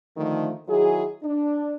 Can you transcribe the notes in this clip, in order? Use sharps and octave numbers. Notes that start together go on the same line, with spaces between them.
D3 D#3 F3 A3
D#3 F#3 E4 G#4
D4